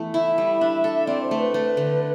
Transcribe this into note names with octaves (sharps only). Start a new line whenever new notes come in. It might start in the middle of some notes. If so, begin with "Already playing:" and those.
Already playing: E3 A3 B3
E4 E5
G3
D4
A4
C4 D5
C5
A3
B4
A3
D3